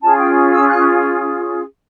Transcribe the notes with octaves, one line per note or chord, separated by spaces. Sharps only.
C#4 F4 G#4 A5
G5
E6
F#6